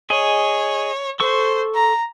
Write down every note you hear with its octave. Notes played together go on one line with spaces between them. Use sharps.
G#4 C#5 D#5
A4 C5 C#6 E6
A#5